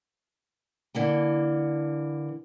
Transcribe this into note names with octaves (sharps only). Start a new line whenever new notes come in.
D3 E3 A#3